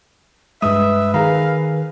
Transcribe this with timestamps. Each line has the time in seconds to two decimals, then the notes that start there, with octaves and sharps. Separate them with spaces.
0.62 G2 G#3 B4 E5 D#6
1.14 D#3 G#4 F5 A#5